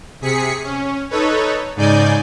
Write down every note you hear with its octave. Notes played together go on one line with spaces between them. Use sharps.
C3 G#4 B6 C#7
C#4
D#4 A4 B4 C#5
G#2 C#3 D#4 D5 G#5 G6